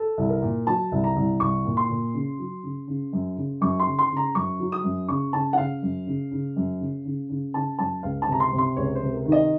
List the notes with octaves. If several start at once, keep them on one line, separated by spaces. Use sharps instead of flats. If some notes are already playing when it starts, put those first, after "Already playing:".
Already playing: A4
C2
A#4
A#2
F#3 A5
C2
A#5
C2
C2 C#6
A#2
C6
A#2
C#3
F#3
C#3
C#3
F#2
C#3
F#2 C#6
C6
C#3
C6
C#3
A#5
F#2 C#6
F#3
D#6
F#2
C#3 C#6
C#3 A5
F#5
C#3 F5
F#2
C#3
C#3
F#2
C#3
C#3
C#3
C#3 A5
F#2 A5
C#2 F5
A5
C3 A#5
C6
C3
C6
C#2 C#5
C5
C3
A#4
D#3
D#5